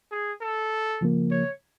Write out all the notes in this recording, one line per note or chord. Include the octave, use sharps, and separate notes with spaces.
G#4
A4
C#3 F3 A#3
C#5